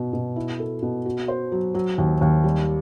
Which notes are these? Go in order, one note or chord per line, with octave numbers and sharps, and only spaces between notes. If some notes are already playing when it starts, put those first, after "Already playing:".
Already playing: B2
B2
E4
A4
B2
F#4
C5
F#3
F#3
D#2
D#2
G3